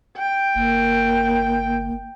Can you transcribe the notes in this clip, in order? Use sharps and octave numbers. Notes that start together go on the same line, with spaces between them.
G5
G1 A#3